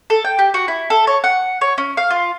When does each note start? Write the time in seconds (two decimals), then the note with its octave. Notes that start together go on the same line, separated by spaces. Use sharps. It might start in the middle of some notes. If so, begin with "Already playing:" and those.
0.10 A4
0.25 G5
0.39 G4
0.54 F#4
0.68 E4
0.90 A4
1.07 C#5
1.24 F#5
1.61 C#5
1.78 C#4
1.97 F5
2.10 F4